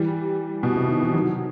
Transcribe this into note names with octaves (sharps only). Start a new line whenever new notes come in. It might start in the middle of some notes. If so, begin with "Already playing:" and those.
Already playing: E3 G3
B2
C3
D#3
E3
D#3 F#3